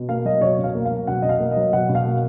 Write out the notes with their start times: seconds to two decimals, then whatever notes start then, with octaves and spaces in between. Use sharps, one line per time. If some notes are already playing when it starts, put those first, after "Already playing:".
Already playing: B2
0.09 A#3 F5
0.25 F#3 D#5
0.41 B2 C#5
0.59 B2
0.64 F5
0.75 A#3
0.85 F5
0.91 F#3
1.07 B2 F#5
1.22 B2 D#5
1.29 F5
1.40 A#3
1.51 D#5
1.57 F#3
1.73 B2 F#5
1.89 B2
1.95 F5
2.06 A#3